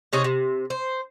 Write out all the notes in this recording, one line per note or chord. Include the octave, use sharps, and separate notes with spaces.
C3 C#4 D#4 G#4
C3
C5